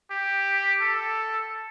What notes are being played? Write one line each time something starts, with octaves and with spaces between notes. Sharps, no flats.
G4
A4